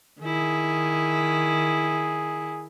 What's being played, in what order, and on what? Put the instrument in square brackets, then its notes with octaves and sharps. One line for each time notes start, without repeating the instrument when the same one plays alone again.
[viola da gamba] D#3 E4 [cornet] G#4